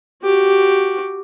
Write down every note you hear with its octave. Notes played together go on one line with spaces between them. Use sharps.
F#4 G4